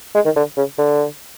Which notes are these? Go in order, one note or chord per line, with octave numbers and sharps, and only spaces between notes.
G#3
D#3
D3
C#3
D3